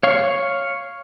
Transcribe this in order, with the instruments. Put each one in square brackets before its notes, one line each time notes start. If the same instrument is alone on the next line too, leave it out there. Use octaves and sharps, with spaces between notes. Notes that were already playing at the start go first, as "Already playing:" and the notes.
[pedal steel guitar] C#5 F5 C#6